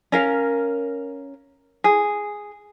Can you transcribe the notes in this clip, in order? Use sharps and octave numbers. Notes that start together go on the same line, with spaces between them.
C#4 A#4 F5
G#4